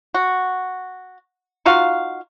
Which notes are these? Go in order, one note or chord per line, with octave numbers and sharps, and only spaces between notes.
F#4
D#4 F4 F#4 F5